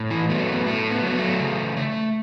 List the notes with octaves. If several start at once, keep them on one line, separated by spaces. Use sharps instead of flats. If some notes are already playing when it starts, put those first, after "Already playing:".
Already playing: A2
E3 E4
F#3 A3 B3
B3
A2 A3
B3
F#3 A3 B3
A3
C#3
A3